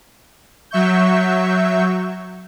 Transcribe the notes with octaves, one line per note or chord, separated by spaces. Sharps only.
F#3 E5 C#6 G6